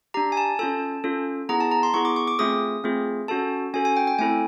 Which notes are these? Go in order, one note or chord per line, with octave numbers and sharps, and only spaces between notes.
D4 G4 A#5
G#5
A5
C#4 F4 A4 A5
C#4 F4 A4
B3 E4 G#4 A#5
A5
A#5
C6
B3 E4 G#4 C#6
D6
C#6
D6
A3 C4 F4 G#4 D#6
A3 C4 F4 G#4
C#4 F#4 A4 A5
C#4 F#4 A4 G#5
G#5
G5
G5
A3 C4 E4 A4 G#5